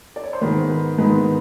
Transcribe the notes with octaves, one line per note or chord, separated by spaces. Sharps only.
D5
C#5
C5
G#2 D#3 G#3 B3 B4
B4
G#2 D#3 G#3 B3 B4